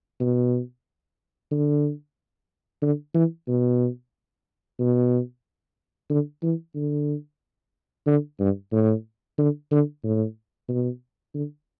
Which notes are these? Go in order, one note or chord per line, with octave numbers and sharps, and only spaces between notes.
B2
D3
D3
E3
B2
B2
D3
E3
D3
D3
G2
A2
D3
D3
A2
B2
D3